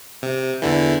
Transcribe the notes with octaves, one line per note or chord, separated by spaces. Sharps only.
C3
E2 D3 E3